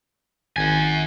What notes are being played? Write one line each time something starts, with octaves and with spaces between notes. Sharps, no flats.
G#1 F#5 G#5